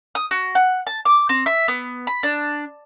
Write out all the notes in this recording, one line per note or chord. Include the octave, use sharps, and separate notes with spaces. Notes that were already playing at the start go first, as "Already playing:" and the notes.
D#6
F#4
F#5
A5
D6
C4
E5
B3
B5
D4